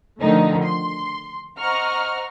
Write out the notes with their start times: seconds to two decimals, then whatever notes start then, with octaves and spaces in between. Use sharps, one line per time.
0.20 D3 D#3 F3 A3 D#4
0.63 C6
1.58 C5 D#5 F#5 A#5 C#6 F6